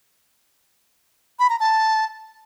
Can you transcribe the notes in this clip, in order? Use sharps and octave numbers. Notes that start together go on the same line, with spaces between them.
B5
A#5
A5